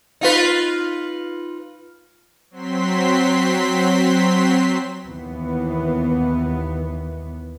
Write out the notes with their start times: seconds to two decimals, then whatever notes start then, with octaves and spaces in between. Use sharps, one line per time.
0.21 D#4 F4 B4
2.50 F#3 C4 C6 B6
5.06 D#2 E3 B3